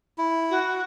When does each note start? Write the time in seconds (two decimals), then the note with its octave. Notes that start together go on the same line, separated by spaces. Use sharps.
0.18 E4
0.50 F#4